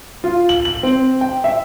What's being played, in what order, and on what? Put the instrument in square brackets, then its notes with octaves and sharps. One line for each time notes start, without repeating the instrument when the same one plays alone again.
[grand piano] F4
F#7
F#7
C4
G5
E5